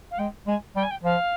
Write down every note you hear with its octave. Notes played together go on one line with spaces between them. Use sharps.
F5
G#3 G5
G#3 G#5
G3 G5
G#5
G5
F3 F5